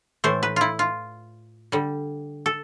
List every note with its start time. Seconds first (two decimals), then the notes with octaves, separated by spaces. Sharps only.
0.24 A2 E3 A3 C5
0.43 B4
0.56 E4 F4
0.79 F4
1.72 D3 G3
2.46 A4